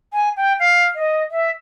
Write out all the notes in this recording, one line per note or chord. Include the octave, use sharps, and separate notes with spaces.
G#5
G5
F5
D#5
E5